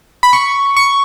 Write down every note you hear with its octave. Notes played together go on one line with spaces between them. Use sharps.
B5
C#6
C#6